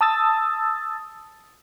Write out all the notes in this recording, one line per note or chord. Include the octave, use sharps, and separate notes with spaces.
A5 D#6 E6 A6